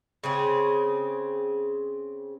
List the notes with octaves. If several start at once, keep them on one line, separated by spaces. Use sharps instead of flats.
C#3 C4 G#4